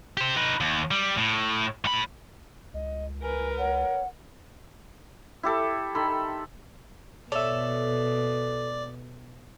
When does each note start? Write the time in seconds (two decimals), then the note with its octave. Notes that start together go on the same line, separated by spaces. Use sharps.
0.17 G4 C5
0.37 D#4 B4
0.61 D#2
0.91 G3
1.17 A2
1.85 A2 B5
2.74 C#2 D#5
3.22 A#4 B4 G#5
3.58 C#5 F#5
5.43 E4 G4 A4
5.95 D#3 A4 B5 C6
7.32 B2 A4 C#5 D5 E5